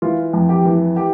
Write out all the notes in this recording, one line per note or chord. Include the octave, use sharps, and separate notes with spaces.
E3 F4
F2
G4
E3
G4